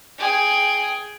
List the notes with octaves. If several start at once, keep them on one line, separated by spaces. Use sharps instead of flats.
G#4 G5